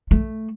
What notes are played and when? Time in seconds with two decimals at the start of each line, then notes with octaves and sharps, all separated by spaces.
0.11 A3